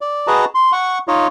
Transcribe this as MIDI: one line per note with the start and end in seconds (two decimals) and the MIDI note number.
0.01 0.27 74
0.27 0.45 66
0.27 0.45 68
0.27 0.45 71
0.27 0.45 75
0.27 0.45 81
0.27 0.45 82
0.55 0.72 84
0.72 0.98 78
0.72 0.98 85
1.08 1.27 63
1.08 1.27 65
1.08 1.27 73
1.08 1.27 75